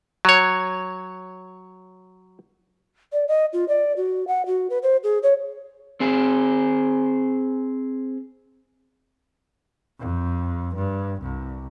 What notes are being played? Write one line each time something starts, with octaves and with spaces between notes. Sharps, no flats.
F#3 C#5
D5
D#5
F4
D5
F#4
F#5
F#4
B4
C5
G#4
C#5
C4 G#4
F2
G2
C2